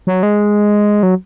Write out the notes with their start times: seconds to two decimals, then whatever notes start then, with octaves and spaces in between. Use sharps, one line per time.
0.07 F#3
0.23 G#3
1.03 F#3